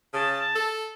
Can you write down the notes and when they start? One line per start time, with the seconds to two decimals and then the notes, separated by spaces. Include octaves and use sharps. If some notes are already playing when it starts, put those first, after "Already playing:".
0.13 C#3 A5
0.55 A4